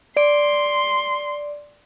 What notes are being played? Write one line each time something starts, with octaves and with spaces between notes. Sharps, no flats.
D5 C6 D7